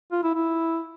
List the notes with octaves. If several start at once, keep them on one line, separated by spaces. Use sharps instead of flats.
F4
E4
E4